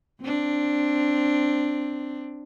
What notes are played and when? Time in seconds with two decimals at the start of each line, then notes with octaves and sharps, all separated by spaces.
0.21 C4 D4